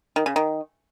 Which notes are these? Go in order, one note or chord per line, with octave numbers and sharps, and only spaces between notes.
D#3
C#3
D#3